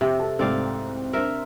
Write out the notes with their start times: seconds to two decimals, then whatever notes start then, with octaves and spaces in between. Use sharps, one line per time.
0.01 F2 C3 G5 D6
0.19 A4 A5
0.39 C2 G#2 A3 C4 D5 F5
1.13 D4 A#4 C5 E5